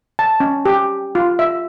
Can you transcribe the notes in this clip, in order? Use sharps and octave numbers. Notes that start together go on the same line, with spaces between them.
A5
C#4
G4
F4
E5